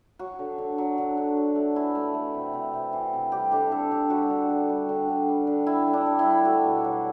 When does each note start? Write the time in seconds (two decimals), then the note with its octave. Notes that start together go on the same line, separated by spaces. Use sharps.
0.19 F#3 F#4
0.39 D3
0.58 D3
0.78 F#3
0.98 D3
1.17 D3
1.37 F#3
1.56 A3
1.76 E3 E4
1.95 A3
2.14 A3
2.34 C3
2.54 C3
2.74 C3
2.93 E3
3.13 C3
3.32 G3 G4
3.52 D3 G4
3.71 D3 A4
3.91 D3 G4
4.10 G3 F#4
4.30 D3
4.49 D3
4.69 G3
4.89 D3
5.09 D3
5.29 G3
5.47 D3
5.67 G3 E4
5.87 D3
5.93 D4
6.06 G3
6.19 E4
6.26 G3
6.45 A3 F#4
6.64 B2
6.84 F#3